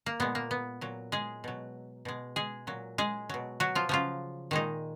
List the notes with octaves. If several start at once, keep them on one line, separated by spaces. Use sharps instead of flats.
A#3
A#2 G#3 B3
A#3
B3
A#2 F#3
G#3 G#4
B2 F#3
B2 G#3
G#3 G#4
A#2 F#3
G#3 G#4
B2 F#3
F#3 F#4
F3 F4
C#3 F3 F#3 F4
A#2 D#3 G#3 D#4